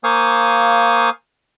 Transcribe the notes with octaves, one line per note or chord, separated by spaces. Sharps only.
A#3 C5 F5 G#5 C#6 D#6